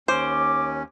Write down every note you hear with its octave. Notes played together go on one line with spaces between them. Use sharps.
D#2 C#4 C5 D6